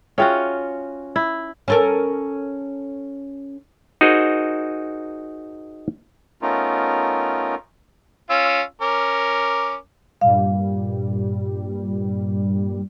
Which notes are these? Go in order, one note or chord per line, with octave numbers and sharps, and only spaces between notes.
C#4 F4 F#4 G#4 E5 G5
E4
C#4 A4 A#4
D#4 F#4 G#4 A#4 C5
A3 B3 C#4 D#4 F4 A#4
C#4 F4 E6
C#4 A#4 D6
G2 A#2 G3 F5